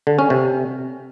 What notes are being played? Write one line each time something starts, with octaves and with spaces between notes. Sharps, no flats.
D3
C#4
C3